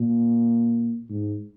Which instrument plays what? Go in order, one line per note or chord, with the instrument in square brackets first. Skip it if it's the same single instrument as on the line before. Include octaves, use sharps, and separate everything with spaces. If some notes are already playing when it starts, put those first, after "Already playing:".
Already playing: [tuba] A#2
G#2